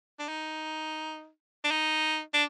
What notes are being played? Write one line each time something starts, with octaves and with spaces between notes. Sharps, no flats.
D4
D#4
D4
D#4
D4